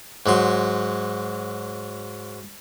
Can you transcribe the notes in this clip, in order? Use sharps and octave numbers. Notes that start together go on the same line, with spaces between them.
G#2 F#3 C6